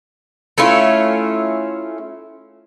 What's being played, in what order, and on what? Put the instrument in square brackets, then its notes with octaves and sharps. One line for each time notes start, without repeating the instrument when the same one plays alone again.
[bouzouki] A3 C#4 E4 F4